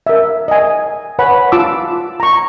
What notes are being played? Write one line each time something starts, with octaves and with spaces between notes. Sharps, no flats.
A#4 E5
D#5 G#5
B4 C#5 F#5 G#5 B5
F4 A5 C6 D6 E6
A#5 C#6